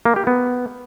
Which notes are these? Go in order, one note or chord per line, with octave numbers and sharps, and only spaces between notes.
A#3
G4
B3